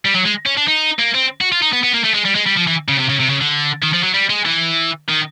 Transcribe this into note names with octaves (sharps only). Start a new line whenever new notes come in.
G3
F#3
G#3
C#4
D4
D#4
A#3
C4
F#4
F4
D#4
B3
B3
A#3
A3
G#3
G3
G#3
G3
F3
E3
C#3
C3
C#3
C3
C#3
D3
D#3
F3
F#3
G3
G#3
E3
D#3